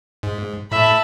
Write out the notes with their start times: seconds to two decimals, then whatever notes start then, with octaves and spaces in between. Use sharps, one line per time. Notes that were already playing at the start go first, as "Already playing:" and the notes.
0.23 G#2
0.72 A2 E5 A5 B5